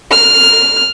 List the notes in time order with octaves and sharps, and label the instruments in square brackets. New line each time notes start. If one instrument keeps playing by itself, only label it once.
[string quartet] F6